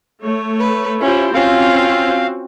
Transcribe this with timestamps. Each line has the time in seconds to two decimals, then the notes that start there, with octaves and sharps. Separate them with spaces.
0.23 A3 C#5
0.60 B4
1.01 C#4 E4 F4 G4 C5
1.34 C4 C#4 F4 F#4 F5